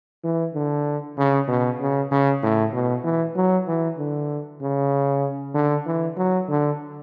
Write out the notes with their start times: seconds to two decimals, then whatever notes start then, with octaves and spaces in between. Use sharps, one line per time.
0.24 E3
0.54 D3
1.18 C#3
1.48 B2
1.80 C#3
2.11 C#3
2.43 A2
2.73 B2
3.04 E3
3.35 F#3
3.67 E3
3.98 D3
4.61 C#3
5.54 D3
5.86 E3
6.17 F#3
6.49 D3